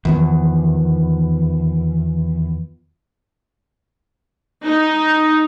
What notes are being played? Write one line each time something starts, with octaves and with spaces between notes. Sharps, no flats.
E2 D#3 F3 B3
D#4